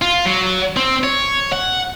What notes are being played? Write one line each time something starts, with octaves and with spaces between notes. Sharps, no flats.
F4
F#3
C4
C#5
F#5